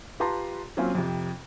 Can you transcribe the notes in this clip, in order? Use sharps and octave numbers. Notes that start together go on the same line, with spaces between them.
F4 G4 B4 A5 A#5 C6
F#3 A#3 C4 C#4 F4
F2 C3